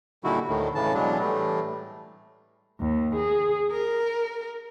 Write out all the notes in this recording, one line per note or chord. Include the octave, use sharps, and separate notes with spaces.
A#2 D3 D#3 G3 E4 F#4
D2 A2 D#3
A2 C#3 E3 A5
B2 E3 F#3 G#3 D4
A2 E3 G3 A3
D#2
G#4
A#4